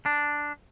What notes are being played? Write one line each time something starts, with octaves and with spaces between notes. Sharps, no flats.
D4